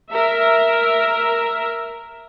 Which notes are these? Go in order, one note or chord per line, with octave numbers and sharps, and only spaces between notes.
A#4 E5